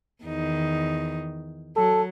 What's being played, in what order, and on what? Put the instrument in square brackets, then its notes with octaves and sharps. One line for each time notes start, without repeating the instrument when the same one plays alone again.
[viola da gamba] E2 D#3 D#4
[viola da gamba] F#3 [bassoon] A4